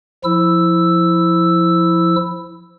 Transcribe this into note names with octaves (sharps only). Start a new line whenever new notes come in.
F3 E4 E6